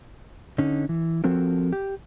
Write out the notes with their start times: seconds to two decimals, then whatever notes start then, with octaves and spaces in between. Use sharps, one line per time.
0.58 D3 C#4 D#4
0.89 E3
1.24 F3 C4 F#4 A4 A#4
1.72 G4